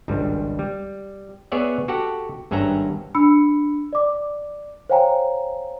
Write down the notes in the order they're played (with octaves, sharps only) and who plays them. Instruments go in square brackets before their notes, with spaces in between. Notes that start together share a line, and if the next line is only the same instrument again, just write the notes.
[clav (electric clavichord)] G#1 C#2 G2 G3
G3
B3 G#4 C#5 D5 E5 F#5
F#4 G4 A4 F#5
G#1 G2 C#4 E5 F#5 A#5
[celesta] D4 B5 E6 C#7
D5 D6
C5 C#5 F5 G5 G#5 A#5